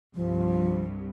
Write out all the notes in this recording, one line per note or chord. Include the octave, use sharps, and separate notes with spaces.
C2 G2 F3